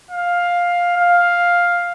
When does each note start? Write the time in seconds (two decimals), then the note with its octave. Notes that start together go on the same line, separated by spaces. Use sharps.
0.11 F5
0.97 F5